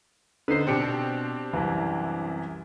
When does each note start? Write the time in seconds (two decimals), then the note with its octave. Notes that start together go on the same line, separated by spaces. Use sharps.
0.48 D3 D#4 B4 C5 C7
0.67 B2 C4 D4 G4 C#7
1.53 C2 F#2 E3